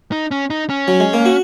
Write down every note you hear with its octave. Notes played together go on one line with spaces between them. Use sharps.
D#4
C#4
D#4
C#4
F#3
G#3
A#3
F#4